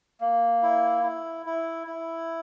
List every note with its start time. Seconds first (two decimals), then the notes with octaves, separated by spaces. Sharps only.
0.21 A#3
0.62 E4
1.03 E4
1.46 E4
1.87 E4